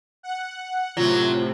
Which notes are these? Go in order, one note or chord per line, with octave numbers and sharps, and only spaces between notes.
F#5
A2 C3 F#3 F4